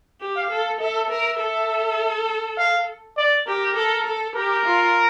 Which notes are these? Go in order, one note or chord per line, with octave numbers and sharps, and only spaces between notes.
G4
F5
A4
A4 E5
A#4
A4
F5
D5
G4 A#4
A4
A4
G4 A#4
F4